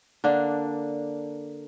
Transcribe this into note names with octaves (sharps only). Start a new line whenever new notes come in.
D3 A#3 D4